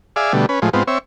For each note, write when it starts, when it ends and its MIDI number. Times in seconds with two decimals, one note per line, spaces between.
0.16 0.33 68
0.16 0.33 74
0.16 0.33 76
0.16 0.33 77
0.33 0.46 47
0.33 0.46 50
0.33 0.46 55
0.33 0.46 57
0.49 0.60 61
0.49 0.60 71
0.62 0.69 45
0.62 0.69 53
0.62 0.69 56
0.73 0.83 44
0.73 0.83 59
0.73 0.83 60
0.73 0.83 65
0.87 0.98 60
0.87 0.98 73
0.87 0.98 76